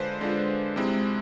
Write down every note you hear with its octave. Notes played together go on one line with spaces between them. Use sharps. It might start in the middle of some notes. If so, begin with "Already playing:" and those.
Already playing: D3 G#3 D4 F4 B4 C5
D3 G#3 D4 F4
C3 G#3 C4 E4